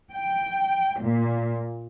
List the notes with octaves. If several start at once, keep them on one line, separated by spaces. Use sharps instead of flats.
G5
A#2